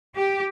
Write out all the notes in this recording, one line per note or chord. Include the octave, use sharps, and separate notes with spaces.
G4